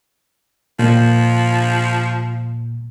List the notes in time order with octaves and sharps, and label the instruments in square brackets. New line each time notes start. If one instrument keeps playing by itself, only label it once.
[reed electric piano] A#2 [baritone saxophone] F3